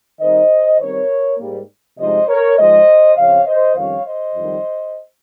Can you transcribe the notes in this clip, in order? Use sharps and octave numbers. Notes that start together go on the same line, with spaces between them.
D#3 G3 C4 D#4 C5 D#5
D#3 G3 C4 A#4 C#5
G#2 G3 A#3
C3 F3 G#3 D#4 C5 D#5
A#4 C#5
G#2 F3 G#3 C5 D#5
C#3 F3 C4 C#5 F5
C5 D#5
F2 D#3 G3 C#4 F4 C#5 F5
C5 D#5
F2 D#3 G3